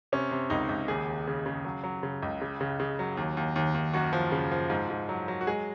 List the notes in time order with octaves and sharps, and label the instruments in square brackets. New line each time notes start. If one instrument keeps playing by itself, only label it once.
[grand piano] C3 C#4
C3
C#2 D#4
C#2
D#2 G#4
D#2
C#3
C#3
F#3
F#3
C#3
C#2
C#3
C#3
C#3
F#3
D#2
D#2
D#2
D#2
F#2 F#4
F3
C#3
F3
G#2
G#2
F#3
F#3
F#4
G#3 G#4